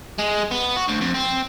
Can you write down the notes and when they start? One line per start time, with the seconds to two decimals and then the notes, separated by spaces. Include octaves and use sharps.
0.19 G#3
0.51 B3
0.76 F#4
0.88 D2
1.01 F2
1.14 C4